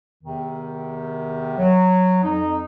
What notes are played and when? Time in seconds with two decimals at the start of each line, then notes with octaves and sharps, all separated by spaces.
0.24 E2 C3 D#3
1.58 F#3
2.24 F2 D#4